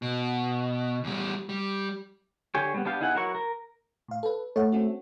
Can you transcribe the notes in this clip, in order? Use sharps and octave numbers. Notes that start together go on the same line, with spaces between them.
B2
E2 G3
G3
D3 G4 G#4 C#5
G3 B3
B3 D4 G4 F5
B3 D#4 E4 G#4 F#5
F#3 E4 A#4 F#5 C#6
A#4
A2 F5
A4 B4
A3 C#5 F#5
C4 C#4 F#4